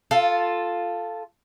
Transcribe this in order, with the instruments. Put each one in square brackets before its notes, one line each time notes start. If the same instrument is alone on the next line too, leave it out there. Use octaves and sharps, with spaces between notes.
[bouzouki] F4 A4